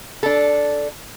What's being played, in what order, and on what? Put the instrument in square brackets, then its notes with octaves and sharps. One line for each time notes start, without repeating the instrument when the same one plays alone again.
[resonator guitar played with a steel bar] D4 A4